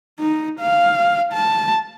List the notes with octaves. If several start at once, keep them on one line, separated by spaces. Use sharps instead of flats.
D#4
F5
A5